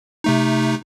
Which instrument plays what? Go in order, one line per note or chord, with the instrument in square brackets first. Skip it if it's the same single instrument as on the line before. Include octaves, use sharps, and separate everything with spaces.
[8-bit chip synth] C3 A3 D#4